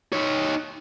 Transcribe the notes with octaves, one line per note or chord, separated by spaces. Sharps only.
D#4 C#5